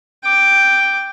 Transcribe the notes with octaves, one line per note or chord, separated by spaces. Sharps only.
G5 D6